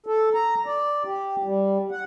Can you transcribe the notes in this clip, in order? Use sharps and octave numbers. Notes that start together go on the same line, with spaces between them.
A4
A#5
D5
G4
G3
F#5